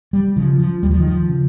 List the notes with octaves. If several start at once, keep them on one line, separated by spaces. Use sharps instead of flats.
G3
C#3 F3
F3
D#2 G3
F3
D#3
F3
C#3